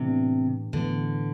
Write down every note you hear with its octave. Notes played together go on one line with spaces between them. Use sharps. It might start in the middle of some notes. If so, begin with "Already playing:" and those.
Already playing: A2 C3 E3 B3 D4
A2 D3 E3 B3